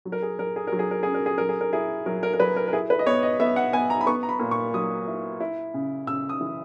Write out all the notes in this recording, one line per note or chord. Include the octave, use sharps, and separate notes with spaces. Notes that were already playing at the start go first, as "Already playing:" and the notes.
F#3
A#4
G#4
F#3 A#4
G#4
F#3 A#4
G#4
A#4
C#4 G#4
A#4
G#4
F#3 A#4
G#4
A#4
E4 G#4
F#3 A#4
A#4
A#4
F#3 B4
A#4
A#4
E4 G#4
B4
D#5
B3 C#5
D#5
B3 E5
F#5
B3 G#5
A#5
B5
B3 C#6
A#5
B5
A#2
C#6
F#3 D#6
E4
E4
C#3
C#3 E6
D#6
E3